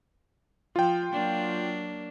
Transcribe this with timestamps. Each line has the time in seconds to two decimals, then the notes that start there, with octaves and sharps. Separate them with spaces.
0.76 F3 F4 G5
1.13 F#3 A#3 D4